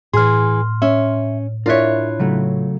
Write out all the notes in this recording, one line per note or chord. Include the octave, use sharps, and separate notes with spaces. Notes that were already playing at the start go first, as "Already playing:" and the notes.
A2 E3 G#4 C6 F6
C#4 E5
D4 E4 F4 A#4 C#5 D5 E5 F#6
C#3 F#3 A3